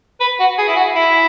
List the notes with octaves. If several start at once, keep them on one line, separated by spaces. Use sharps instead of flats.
B4
F#4
G#4
E4
F#4
E4